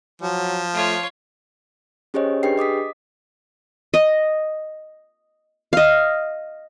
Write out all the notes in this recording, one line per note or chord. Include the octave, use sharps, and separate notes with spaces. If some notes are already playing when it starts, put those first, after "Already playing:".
F3 F#3
A3 F4 C#5
C#4 G4 G#4 C5 C#5 D#5
D4 G4 G#4 B4 G5 C7
D#5 D6 D#6 B6
D#5
D#5 F5